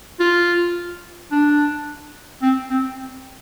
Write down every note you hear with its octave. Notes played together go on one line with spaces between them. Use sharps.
F4
D4
C4
C4